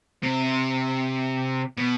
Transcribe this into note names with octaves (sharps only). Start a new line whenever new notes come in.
C3
B2